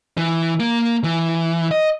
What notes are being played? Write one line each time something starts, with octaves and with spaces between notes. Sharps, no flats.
E3
A#3
E3
D#5